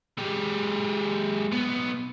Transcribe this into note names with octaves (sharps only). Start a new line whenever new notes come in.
G#3 G4
B1 B3